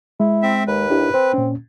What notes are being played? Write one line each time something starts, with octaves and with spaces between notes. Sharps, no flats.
G#3 E4
C4 E5
D#2 B4
D4 E4 G4
C4 C5
A#2 C#4